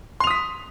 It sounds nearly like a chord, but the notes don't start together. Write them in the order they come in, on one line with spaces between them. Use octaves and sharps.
C6 F7 D#6 B6